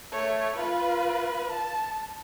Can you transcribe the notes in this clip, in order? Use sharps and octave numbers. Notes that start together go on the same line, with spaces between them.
A3 C#5
F4 B4
A5